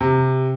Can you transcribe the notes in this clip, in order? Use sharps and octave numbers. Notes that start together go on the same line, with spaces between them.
C3